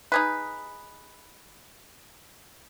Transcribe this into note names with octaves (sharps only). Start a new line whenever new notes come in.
D#4 G#4 B4